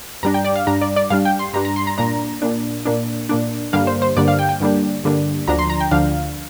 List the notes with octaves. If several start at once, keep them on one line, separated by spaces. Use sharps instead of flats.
G2 G3 D4 A#5
G5
D5
F5
G2 G3 D4 A#5
D5
D5
G2 G3 D4 F5
G5
C6
G2 G3 D4 A#5
A#5
C6
A#5
A#2 A#3 D4 A#5
A#2 A#3 D4
A#2 A#3 D4
A#2 A#3 D4
G2 D3 G3 A#3 D4 F5
C5
C5
G2 D3 G3 A#3 D4 D5
F5
G5
G5
G2 D3 G3 A#3 D4
G2 D3 G3 A#3 D4
D2 D3 F3 D4 A#5
C6
A#5
G5
D2 D3 F3 D4 F5